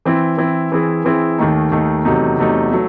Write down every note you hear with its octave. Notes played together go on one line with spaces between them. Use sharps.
E3 C4 E4
E3 C4 E4
E3 C4 E4 G#4
E3 C4 E4 G#4
D#2 D#3 A3 D#4
D#2 D#3 A3 D#4
E2 C3 F#3 A3 D#4
E2 C3 F#3 A3 D#4
F#3 A3